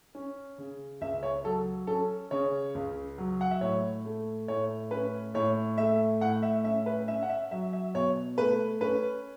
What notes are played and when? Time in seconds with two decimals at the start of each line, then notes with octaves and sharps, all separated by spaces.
0.15 C#4
0.58 C#3
1.01 C#2 E5
1.23 C#5
1.44 F#3 A4
1.87 C#4 A4
2.31 C#3 C#5
2.75 C#2
3.18 F#3
3.41 F#5
3.51 E5
3.61 A2 C#5
4.05 A3
4.48 A2 C#5
4.91 C#4 B4
5.34 A2 C#5
5.78 A3 E5
6.21 A2 F#5
6.43 E5
6.64 C#4 E5
6.86 B4
7.08 C#4 E5
7.23 F#5
7.29 E5
7.51 F#3 E5
7.73 E5
7.94 B2 C#5
8.38 A3 B4
8.81 C#4 B4